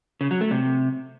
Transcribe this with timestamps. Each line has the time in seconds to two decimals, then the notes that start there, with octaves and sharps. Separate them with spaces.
0.21 C#3
0.31 F#3
0.41 A3
0.51 C3